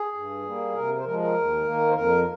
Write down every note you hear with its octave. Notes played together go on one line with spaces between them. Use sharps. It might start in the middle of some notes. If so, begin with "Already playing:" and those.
Already playing: G#4
G2
G3 A#3
C3 A#4
C5
F3 G#3 A#4
A#4
D#2
D#3 A#3
C5
F2 A#4